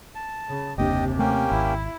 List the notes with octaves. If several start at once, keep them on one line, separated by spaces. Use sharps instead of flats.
A5
C#3
F#1 D#2 C3 A#3 D4 G4 D#5
A3 A#3 C#4 G4
G#1 E4